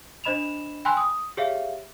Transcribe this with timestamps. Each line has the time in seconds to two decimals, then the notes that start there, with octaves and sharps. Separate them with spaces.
0.24 D4 C5 D#5 B5 E7 F7
0.85 G5 G#5 B5 C6 E6 F#6
0.97 D#6
1.37 G4 G#4 C#5 E5 F5